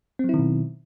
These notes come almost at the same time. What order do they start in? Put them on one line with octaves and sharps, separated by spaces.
C4 F#3 E4 D#3 B2